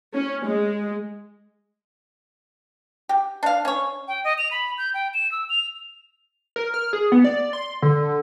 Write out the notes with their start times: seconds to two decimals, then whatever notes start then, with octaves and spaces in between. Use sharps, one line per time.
0.13 C#4
0.46 G#3
3.09 G4
3.43 D4 F5
3.65 C#4 C#5
4.08 G5
4.24 D#5
4.38 F7
4.51 B5
4.78 G6
4.94 G5
5.14 E7
5.32 E6
5.50 F7
6.56 A#4
6.74 F6
6.93 G#4
7.12 B3
7.24 D5
7.53 C6
7.82 D3